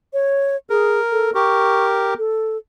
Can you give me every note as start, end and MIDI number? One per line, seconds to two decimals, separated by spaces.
0.13 0.56 73
0.70 1.00 68
0.70 1.31 70
1.12 1.32 69
1.35 2.14 67
1.35 2.14 70
1.35 1.85 85
2.18 2.57 69